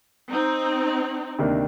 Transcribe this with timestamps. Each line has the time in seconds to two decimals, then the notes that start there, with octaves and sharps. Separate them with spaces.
0.29 C4 D#4
1.39 D2 C3 D#3 A#3 D4